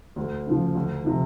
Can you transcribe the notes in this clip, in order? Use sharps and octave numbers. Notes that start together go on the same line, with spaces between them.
D2
C#3 F3
D2
C3 F3